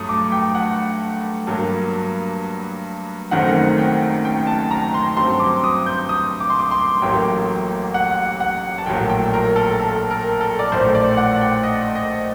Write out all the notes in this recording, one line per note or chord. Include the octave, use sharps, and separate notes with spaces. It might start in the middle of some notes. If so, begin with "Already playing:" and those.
Already playing: G2 F#3 A3 D#6
D6
G5
F#5
G2 F#3 A#3
F#1 F#2 D#3 A3 C4 F#5
G5
G5
A5
A#5
C6
G2 F#3 C4 C6
D6
D#6
G6
D#6
D6
C6
D6
C6
A1 A2 F#3 A#3 G5
F#5
F#5
A5
A#1 A2 F#3 A#3 G5
G5
A#4
A4
A4
A#4
A4
D5
A#1 A2 A3 C5
D5
F#5
G5
D#5
D#5